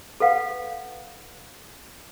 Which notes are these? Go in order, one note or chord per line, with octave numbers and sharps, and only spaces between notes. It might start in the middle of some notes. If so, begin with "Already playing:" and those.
A4 B4 F5 F#5